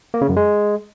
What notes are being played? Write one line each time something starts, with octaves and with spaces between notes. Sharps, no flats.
A#3
C#3
F#2
G#3